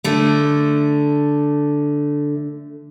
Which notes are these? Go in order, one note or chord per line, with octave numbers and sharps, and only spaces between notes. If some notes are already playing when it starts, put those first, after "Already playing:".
D3 A3